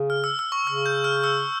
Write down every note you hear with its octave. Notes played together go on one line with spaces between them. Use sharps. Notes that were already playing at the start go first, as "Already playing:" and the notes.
Already playing: C#3
F6
E6
E6
C#6
C#3 E6
G6
F6
E6